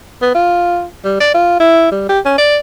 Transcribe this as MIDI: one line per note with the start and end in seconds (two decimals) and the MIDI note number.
0.22 0.33 59
0.35 0.84 65
1.05 1.20 55
1.20 1.33 74
1.34 1.59 65
1.60 1.91 64
1.92 2.08 55
2.09 2.19 67
2.26 2.36 61
2.38 2.58 74